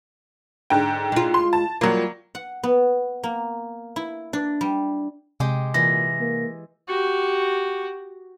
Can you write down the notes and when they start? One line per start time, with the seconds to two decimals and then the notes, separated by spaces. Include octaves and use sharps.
0.70 G#2 D3 G5
1.12 G#3 F4
1.34 C6
1.53 A5
1.81 F#3 G3 A#3 F4
2.35 F#5
2.63 B3
3.24 A#3
3.96 E4
4.33 D4
4.61 G3
5.40 C3 G#3 G4
5.74 A#2 E3 A#6
6.20 A#3
6.89 F#4 G4